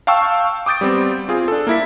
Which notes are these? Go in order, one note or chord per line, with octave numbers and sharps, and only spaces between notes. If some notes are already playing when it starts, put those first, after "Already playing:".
F5 G5 A5 C#6 E6
D6 D#6 G6 A6 D7
G3 B3 C4
C4 F4 G#4
D4 A4
A#3 E4 B6